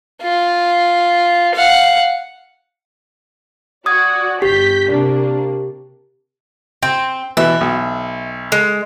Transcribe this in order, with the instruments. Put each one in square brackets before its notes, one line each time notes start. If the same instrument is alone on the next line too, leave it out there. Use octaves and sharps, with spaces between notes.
[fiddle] F4
F5 F#5
[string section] F#4 D5 [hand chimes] D#6 G#6
[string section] G1 G6 B6 [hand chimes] G4
[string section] C3 A#3 D4
[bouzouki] C4 [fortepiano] G5
[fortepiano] B2 E3 [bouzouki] E5
[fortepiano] B1
[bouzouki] G#3